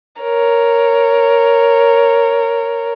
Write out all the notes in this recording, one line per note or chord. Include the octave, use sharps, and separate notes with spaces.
A#4 C#5